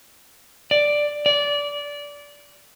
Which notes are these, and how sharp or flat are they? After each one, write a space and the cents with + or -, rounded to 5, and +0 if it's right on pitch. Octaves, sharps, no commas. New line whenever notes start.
D5 +5
D5 -20